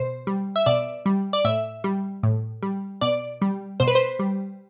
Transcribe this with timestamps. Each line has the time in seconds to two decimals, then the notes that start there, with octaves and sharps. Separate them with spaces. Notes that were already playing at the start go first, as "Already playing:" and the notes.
Already playing: B2 C5
0.27 G3
0.56 E5
0.66 B2 D5
1.06 G3
1.33 D5
1.45 A2 E5
1.84 G3
2.23 A2
2.63 G3
3.01 B2 D5
3.42 G3
3.80 B2 C5
3.88 B4
3.95 C5
4.19 G3